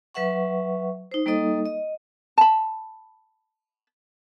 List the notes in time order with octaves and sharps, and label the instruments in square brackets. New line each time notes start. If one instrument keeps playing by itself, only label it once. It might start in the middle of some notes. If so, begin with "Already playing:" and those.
[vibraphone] F#3 B4 E5 F#5 C#6
D#4 C5
G3 A#3 D#4 A4 D#5 D#6
D#5
[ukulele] A5 B5